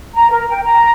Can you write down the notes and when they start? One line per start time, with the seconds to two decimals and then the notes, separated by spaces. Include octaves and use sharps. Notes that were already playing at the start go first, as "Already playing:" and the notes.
0.14 A#5
0.31 A#4
0.49 G5
0.64 A#5